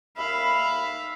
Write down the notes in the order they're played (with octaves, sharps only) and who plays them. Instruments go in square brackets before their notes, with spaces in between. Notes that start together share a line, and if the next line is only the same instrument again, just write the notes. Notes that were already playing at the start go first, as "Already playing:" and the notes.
[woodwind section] D#2 B5 [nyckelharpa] E5 F5